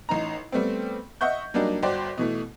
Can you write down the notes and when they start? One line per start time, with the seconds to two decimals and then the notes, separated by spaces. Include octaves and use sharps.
0.09 A1 D#4 A#5
0.52 G3 A3 B3 C4
1.21 D#5 E5 F#5 C#6 G6
1.54 F#3 G3 A#3 D4 D#4
1.83 G1 F#4 C5 D5 G5
2.17 B2 E3 A3